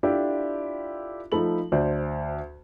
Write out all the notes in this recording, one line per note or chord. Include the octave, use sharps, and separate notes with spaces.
D4 E4 F4 G4 A4 E5
F3 A3 D#4 A4 B5 F#7
D2 C5 D5